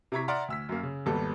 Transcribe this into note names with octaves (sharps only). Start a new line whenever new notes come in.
C3 E4 A#5 C#6 G#6 B6
D5 E5 F#5 A#5 C6 F6
D2 E6 B6
F#2 A#3
C#3
G#1 D#2 G3 B3 A4